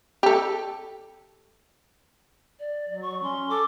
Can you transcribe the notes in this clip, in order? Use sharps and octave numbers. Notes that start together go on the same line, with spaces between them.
G4 A4
D5
F#3
C#6
C#4 C6
A4 D6